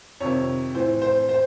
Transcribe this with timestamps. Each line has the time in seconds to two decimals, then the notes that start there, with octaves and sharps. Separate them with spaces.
0.20 F2 C3 D#3 C#5
0.75 A2 E3 C5
1.02 C5
1.29 C5